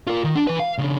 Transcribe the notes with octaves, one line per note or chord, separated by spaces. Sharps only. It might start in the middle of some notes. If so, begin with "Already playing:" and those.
F4 A#4
D#3
D4
E3 B4
F5
C#3 D4